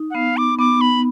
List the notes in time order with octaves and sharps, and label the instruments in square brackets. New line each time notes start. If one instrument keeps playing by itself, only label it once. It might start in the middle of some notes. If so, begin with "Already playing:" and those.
Already playing: [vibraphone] D#4
[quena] F#5
[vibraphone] B3 [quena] F5
[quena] D6
[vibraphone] B3 [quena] D6
[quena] B5